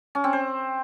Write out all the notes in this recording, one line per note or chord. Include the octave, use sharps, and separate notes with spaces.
C#4
C4
C5